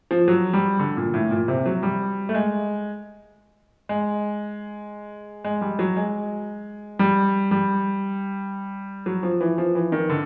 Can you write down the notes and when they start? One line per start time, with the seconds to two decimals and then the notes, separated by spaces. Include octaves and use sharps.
0.11 F3
0.28 F#3
0.53 G3
0.79 D3
0.97 A#2
1.14 A2
1.31 A#2
1.48 C3
1.66 F#3
1.83 G3
2.29 A3
2.34 G#3
3.89 G#3
5.44 G#3
5.61 G3
5.79 F#3
5.96 G#3
6.99 G3
7.51 G3
9.06 F#3
9.23 F3
9.41 E3
9.58 F3
9.75 E3
9.92 D#3
10.09 D3